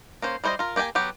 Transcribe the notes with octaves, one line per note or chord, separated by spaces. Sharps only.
A#3 C#4 C5
G3 E4 C5 C#5 D#5
F4 A#4
A#3 G4 D5 G5 G#5
F#3 B3 G4